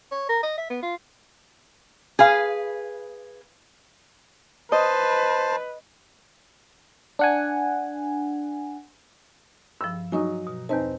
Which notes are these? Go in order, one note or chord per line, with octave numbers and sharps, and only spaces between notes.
C#5
A#4
D#5
E5
B3
F4
G#4 B4 F5
B4 C5 D#5 A5
D4 F#5 G#5
G2 F3 E6
F#3 D#4 G#5 C#6 D#6
B2
E2 C4 D#4 B4 A5